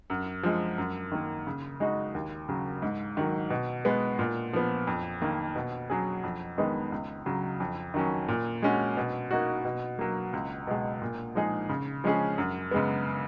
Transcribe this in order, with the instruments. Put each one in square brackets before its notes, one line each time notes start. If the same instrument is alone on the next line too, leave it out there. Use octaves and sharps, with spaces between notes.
[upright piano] F#2
F3 G#3
F#2
D#3 A#3
C#3
G#3 D#4 F#4
D#2
C#3 F#3
G#2
D#3 F#3
B2
G#3 B3
A#2
F3 B3
F2
D#3 A#3
B2
F#3 C#4 G#4
F2
D#3 G#3 B3 D#4
C#2
C#3 F#3
F2
D#3 F#3 C#4
A#2
G#3 C#4 F#4
B2
A#3 D#4 F#4
B2
F#3 A#3
C#2
B2 G#3
A#2
F3 G#3 D#4 G#4
C#3
F3 G#3 C#4 G#4
F#2
C#3 G#3 B3